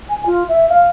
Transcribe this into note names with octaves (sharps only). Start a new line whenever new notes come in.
G#5
F4
E5
F5